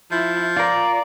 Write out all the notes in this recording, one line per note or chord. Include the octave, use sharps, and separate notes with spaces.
F3 E4
F4 A#4 D5